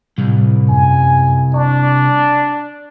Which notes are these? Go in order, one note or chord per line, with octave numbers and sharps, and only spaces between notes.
C2 A2 G3
F#2 G#5
D4 C#6